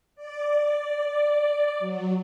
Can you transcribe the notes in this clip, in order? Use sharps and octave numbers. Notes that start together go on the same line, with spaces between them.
D5
F#3